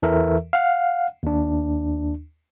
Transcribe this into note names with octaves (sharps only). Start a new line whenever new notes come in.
E2 E3 A4 A#4 E5
F5 F#5
D#2 D4